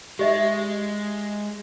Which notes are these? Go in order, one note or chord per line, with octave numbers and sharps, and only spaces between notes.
G#3 G4 D#5 E5